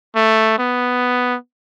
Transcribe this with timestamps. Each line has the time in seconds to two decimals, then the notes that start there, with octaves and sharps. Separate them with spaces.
0.16 A3
0.59 B3